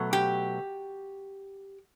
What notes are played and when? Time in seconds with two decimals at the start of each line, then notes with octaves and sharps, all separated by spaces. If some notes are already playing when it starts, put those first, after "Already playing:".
Already playing: B2 F#3 A3
0.13 G4